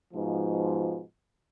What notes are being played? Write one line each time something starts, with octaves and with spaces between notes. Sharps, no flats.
G#2 B2 F3